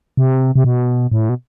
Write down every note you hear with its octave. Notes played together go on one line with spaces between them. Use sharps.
C3
C3
B2
A2
B2